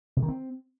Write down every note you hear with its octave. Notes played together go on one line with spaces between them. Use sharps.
C3
D#3
C4